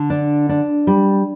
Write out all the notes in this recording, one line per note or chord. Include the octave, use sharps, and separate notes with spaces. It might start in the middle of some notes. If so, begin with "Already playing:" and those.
Already playing: D3
D4
D4
G3